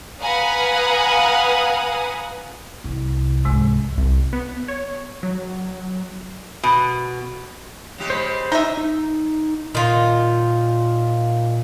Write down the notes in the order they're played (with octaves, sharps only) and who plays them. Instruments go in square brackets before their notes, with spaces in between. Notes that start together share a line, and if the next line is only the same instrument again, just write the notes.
[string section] B4 F5 F#5 G#5 A#5 D#6
[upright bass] C2 C3
[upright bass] C#2 F3 [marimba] G#2 C3 G#3
[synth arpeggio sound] C2
B3
C#5
F#3
[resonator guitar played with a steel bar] B2
[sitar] C#3 G#3 G4
[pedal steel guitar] C5 B5
[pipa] D#4 E5 [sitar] D#5
[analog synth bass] D#4
[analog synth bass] A#2 [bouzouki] D#3 F4